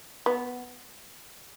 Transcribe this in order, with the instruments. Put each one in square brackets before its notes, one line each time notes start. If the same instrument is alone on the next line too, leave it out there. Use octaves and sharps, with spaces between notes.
[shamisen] B3